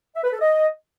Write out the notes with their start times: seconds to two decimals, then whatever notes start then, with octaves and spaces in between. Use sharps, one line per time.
0.15 E5
0.24 B4
0.32 A4
0.41 D#5